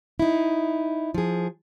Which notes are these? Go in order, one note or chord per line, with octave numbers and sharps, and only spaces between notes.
D#4 E4
F3 G#4